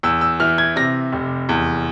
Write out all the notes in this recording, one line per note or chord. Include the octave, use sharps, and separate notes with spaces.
E2 E6
E6
E3 F6
G#6
C3 A#6
F1
E2